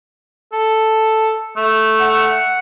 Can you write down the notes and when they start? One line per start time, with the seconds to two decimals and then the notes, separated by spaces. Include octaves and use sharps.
0.53 A4
1.57 A3
2.01 F#5